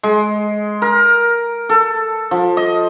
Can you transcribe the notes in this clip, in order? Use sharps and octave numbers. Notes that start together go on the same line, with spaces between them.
G#3
A#4
A4
F3
D#5